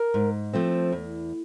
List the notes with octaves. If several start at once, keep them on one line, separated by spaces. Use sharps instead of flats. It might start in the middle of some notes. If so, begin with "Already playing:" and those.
Already playing: A#4
G#2
F3 A3 C4
E2